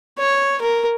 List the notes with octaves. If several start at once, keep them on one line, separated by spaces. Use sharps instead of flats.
C#5
A#4